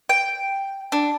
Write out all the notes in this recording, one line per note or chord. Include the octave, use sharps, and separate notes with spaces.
G5
D4